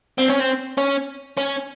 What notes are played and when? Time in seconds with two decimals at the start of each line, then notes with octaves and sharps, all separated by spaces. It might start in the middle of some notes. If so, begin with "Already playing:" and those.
0.18 C4
0.29 C#4
0.40 C4
0.78 C#4
1.38 C#4